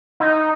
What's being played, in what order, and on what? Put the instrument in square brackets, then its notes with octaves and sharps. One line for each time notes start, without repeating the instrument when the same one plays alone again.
[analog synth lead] D#4